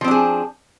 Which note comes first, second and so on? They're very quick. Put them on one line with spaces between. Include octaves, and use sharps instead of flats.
F3 C4 D4 G#4